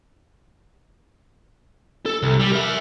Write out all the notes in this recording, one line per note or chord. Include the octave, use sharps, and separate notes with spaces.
A4
C2
G3
A#4 E5